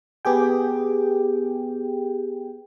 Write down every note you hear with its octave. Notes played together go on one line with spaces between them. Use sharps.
B3 G4 G#4 G5